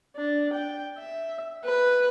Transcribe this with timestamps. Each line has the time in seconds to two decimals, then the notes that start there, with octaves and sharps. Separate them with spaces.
0.17 D4
0.53 G5
0.98 E5
1.65 B4